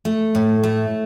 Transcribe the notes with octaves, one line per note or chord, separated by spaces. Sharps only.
A3
A2
A3